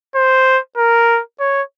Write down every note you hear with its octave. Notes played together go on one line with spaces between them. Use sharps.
C5
A#4
C#5